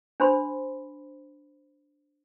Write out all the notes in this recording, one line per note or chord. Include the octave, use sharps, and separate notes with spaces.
D4 C5 B5 C6